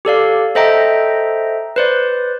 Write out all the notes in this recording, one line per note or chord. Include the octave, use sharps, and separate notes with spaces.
G4 A4 D5 F5
A4 C5 D#5 E5 G5 A#5
B4 C5 D5